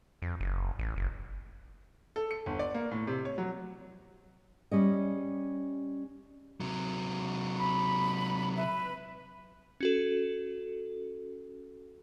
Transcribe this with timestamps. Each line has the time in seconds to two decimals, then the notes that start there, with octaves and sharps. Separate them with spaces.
0.22 F2
0.40 F#1
0.79 A1
0.96 F#1
2.16 A4
2.31 C#7
2.46 G1
2.59 D5
2.74 A#3
2.91 A2
3.07 C3
3.25 C#5
3.38 F#3
4.71 G3 C#4 D#5
6.60 C3 F#3
7.58 B5
8.56 B4 E5
9.80 C#4 F#4 A4